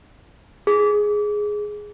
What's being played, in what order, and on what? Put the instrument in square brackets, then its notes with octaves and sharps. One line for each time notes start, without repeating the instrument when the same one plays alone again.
[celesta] G#4